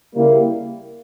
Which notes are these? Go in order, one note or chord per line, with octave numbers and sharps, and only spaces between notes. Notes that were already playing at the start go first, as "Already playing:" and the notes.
C#3 G3 A#3 E4